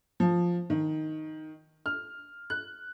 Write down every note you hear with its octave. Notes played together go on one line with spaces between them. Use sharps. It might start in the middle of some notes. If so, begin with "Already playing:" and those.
F3
D#3
F6
F#6